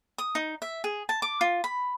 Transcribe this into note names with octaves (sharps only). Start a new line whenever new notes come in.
D#6
D#4
E5
G#4
A5
D6
F4
B5